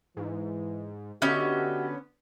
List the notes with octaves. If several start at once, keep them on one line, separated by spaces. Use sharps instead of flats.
G#2 E3
D3 B3 C#4 F#4 G4 D#5 E5